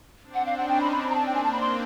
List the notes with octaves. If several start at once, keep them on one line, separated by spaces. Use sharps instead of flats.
C4 D4
F#5
F5
C#4 D#4 F#5
G5
B5
C4 D4 B5
B5
A#5
A5
A#3 C4 G5
G#5
A5
B5
C6